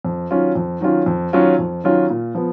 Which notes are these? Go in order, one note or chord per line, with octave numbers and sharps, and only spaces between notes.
F2
D#3 F#3 C#4 F4
F2
D#3 F#3 C#4 F4
F2
D#3 F#3 C#4 F4
F2
D#3 F#3 C#4 F4
A#2
F3 B3